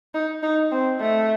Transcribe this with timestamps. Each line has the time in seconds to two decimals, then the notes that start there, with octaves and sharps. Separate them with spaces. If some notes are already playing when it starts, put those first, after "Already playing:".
0.14 D#4
0.43 D#4
0.72 C4
1.00 A3